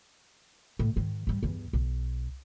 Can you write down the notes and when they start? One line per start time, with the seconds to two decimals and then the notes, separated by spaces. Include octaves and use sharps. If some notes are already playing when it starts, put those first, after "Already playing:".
0.79 A2
0.96 G#2 D#3
1.27 G#2 G3
1.43 E2 G2
1.73 B1